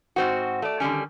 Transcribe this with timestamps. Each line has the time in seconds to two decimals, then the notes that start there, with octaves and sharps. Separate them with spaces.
0.16 G#2 C4 F#4
0.62 A3 D5
0.80 D3 D#3 G3 C#4